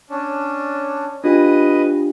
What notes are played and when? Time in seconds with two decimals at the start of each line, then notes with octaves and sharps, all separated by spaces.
0.10 C#4 D4
1.24 D4 F4 G4 B4 D#5 D#6